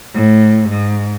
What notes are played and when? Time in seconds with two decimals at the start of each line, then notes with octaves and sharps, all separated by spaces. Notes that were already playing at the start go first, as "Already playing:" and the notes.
0.14 A2
0.69 G#2